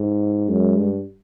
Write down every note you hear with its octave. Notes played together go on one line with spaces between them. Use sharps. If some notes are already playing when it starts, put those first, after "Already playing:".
Already playing: G#2
F#2 G#3
G2